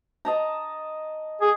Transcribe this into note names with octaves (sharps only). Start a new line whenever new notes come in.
D#5 A5 A#5
G#4